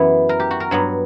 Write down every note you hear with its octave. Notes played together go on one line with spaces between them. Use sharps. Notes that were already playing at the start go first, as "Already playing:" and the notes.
Already playing: F#2 E3 B3 B4
A#4
G4
F#4
A#4
G2 F#3 B3